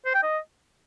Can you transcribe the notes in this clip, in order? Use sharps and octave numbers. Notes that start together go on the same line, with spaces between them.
C5
G5
D#5